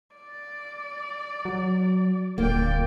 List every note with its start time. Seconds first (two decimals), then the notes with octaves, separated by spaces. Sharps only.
0.15 D5
1.45 F#3
2.38 D#1 D2 A#3 F4 D5 G5